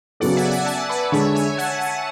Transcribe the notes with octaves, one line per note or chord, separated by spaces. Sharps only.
C#3 F#3 B3 F#4 A4 D5 F#5
E5 G#5
D5 F#5
F#5 A5
B4 D5
D3 G#3 D4 C#5 E5
E5 G#5
F#5 A5
F#5 A5